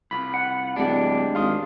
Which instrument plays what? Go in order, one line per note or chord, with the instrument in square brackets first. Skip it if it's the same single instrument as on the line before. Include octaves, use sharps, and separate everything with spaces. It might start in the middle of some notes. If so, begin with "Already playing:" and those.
[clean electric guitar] C2 F4 [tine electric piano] B5
[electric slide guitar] F#5
[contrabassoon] D1 [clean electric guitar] G#3 G4 [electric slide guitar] D4
[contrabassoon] G#1 [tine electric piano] F5 C6 D#6